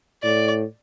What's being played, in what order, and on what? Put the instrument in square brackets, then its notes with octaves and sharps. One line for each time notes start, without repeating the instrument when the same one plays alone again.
[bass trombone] A2 [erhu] D5